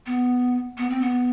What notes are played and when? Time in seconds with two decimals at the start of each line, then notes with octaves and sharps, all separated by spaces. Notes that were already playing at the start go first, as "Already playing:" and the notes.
0.06 B3
0.78 B3
0.90 C4
1.01 B3